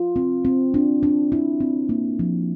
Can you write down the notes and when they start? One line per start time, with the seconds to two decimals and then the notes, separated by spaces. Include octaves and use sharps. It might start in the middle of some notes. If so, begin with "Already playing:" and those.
Already playing: F4
0.16 C4
0.45 C4
0.74 D4
1.03 D4
1.32 E4
1.60 C4
1.89 A#3
2.19 F3